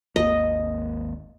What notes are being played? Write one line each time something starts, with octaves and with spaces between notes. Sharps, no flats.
G#1 D#2 A#3 D#5